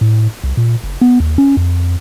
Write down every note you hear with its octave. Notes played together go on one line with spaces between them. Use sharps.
A2
C2
A#2
F#1
B3
D#2
C#4
F2